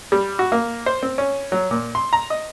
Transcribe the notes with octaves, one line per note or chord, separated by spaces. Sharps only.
G3
F#4
A#3
C5
C4
C#4
F#3
A#2
C6
A#5
D#5